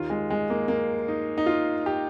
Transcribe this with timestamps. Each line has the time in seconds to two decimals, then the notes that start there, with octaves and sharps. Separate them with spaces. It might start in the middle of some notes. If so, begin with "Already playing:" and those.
Already playing: D#2 D#3 F4
0.10 G#3
0.30 G#3
0.50 A#3
0.68 A#3
1.08 D#4
1.38 D#4
1.46 F4
1.86 G4